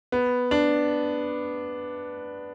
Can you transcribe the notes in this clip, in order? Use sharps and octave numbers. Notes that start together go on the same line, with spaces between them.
B3
D4